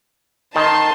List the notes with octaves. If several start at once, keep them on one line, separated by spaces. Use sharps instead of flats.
D#3 D#4 A5 C6